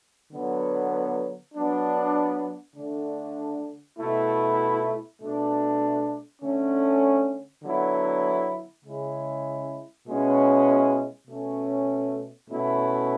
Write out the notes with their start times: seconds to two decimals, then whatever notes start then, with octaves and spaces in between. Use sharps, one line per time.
0.33 D3 F#3 B3
1.54 F#3 B3 D4
2.76 D3 A3 D4
3.98 B2 A3 E4
5.20 B2 A3 D4
6.42 D3 A3 C#4
7.63 D3 F#3 B3 E4
8.85 C#3 G#3 C#4 E4
10.06 B2 G#3 C#4 E4
11.28 B2 A3 C#4
12.50 B2 A3 C#4 E4